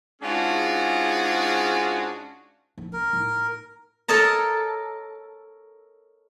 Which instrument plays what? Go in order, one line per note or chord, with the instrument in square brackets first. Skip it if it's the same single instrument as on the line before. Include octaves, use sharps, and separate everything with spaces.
[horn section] G#2 C#4 D4 F4 F#4 G#4
[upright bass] F3 C#4
[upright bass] C2 [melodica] A#4
[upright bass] A2 D#4
[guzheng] A4 A#4 C#5 D#5 A5 A#5